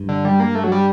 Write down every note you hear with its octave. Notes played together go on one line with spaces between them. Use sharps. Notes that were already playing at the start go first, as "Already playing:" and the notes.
Already playing: G2
D3
G3
A#3
A3
F#3
G3